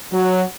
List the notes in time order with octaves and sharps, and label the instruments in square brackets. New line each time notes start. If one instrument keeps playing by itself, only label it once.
[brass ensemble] F#3